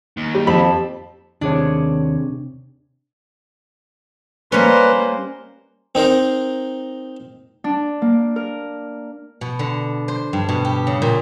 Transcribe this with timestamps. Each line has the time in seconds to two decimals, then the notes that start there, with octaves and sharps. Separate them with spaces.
0.17 D#2
0.35 G3
0.47 F2 G4 A5 B5
1.41 D#2 C3 D4 G#4 C#5
4.52 G3 A#3 C#4 B4 C5
5.95 C4 D#4 A#4 C5
7.64 D4
8.02 A#3
8.36 A#4
9.41 B2
9.59 D3
10.08 C5
10.33 G2
10.49 B2
10.65 G4
10.87 C#3
11.02 A#2